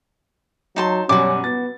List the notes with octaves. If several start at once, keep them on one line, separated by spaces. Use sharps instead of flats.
F#3 D#4 A5 C6
F#2 B2 G3 C#4 F#4 D6
B3 A6